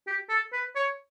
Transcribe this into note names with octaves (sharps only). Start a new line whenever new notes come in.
G4
A4
B4
C#5